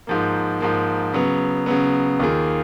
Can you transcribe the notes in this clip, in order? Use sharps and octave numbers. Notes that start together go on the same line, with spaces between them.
G#2 F3 A#3
G#2 F3 A#3
C#3 F#3 B3
C#3 F#3 B3
D#2 D#3 A#3 F4 G#4